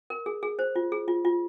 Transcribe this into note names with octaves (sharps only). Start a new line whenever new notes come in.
A#4
G#4
G#4
C5
F4
G#4
F4
F4